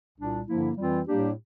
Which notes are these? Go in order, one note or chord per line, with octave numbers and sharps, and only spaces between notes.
C2 A#2 G3 D4
G2 D3 F3 A#3 E4
F2 E3 G3 C4 F4
A2 G3 A#3 D4 G4